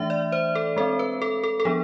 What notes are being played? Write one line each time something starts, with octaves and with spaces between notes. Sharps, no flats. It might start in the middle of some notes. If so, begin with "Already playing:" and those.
Already playing: E3 A3 D4 E5
D5
C5
A4
G#3 C4 A4
B4
A4
A4
A4
F3 B3 D4 G#4